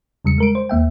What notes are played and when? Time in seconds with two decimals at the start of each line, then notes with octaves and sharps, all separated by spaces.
0.25 E2 C#3 G3 C#7
0.38 G#3 A#4 D7
0.55 C5
0.69 D#2 A#3 E5 G5